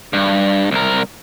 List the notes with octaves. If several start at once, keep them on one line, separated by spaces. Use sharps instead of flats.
G2
C2 A#4